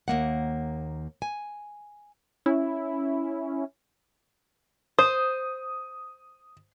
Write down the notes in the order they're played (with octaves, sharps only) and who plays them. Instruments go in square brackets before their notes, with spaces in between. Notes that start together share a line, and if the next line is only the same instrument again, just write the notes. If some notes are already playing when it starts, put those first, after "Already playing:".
[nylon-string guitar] D#2 A#3 F#5
G#5
[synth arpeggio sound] C#4 E4
[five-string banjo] C5 [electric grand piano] D#6